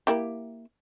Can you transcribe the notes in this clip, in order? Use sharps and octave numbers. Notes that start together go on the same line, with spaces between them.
A#3 E4 G4